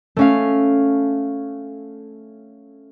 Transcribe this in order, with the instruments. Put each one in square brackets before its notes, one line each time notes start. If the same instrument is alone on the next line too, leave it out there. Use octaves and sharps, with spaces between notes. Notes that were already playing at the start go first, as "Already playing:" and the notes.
[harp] A3 C#4 F5